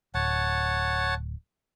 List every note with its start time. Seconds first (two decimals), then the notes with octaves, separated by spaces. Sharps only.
0.14 D1 C#5 F#5 A5